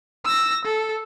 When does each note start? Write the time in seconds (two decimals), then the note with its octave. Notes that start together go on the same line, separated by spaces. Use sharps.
0.24 E6 A#6
0.65 A4